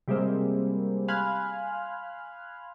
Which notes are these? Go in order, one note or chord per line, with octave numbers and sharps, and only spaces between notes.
C3 G3 G#3 A#3 C4
F5 G#5 B5 C6 F6 F#6